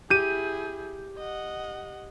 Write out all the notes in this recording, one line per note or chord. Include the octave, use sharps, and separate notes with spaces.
E4 G4 G#4 G6 D#7
D#5 F#5